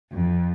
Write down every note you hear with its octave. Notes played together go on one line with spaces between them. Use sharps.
F2